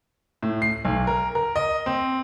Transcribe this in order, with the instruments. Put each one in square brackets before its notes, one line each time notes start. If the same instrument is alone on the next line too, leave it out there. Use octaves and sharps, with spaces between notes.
[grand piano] A2
C7
B1
A#4
A#4
D#5
C4